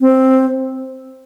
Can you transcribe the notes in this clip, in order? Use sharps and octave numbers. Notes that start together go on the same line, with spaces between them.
C4